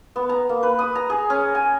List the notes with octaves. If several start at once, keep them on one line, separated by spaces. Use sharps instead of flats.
B3
A#5
A#3
B4
D#6
A#5
G#4
C#4
G#5